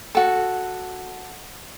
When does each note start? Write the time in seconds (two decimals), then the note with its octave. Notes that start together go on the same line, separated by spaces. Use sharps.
0.15 F#4 A4